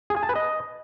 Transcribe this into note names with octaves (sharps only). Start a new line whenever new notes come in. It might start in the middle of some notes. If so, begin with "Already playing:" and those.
G#4
G#5
A5
B4
D#5